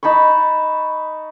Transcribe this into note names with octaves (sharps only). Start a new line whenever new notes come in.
D#4 A5 B5 C#6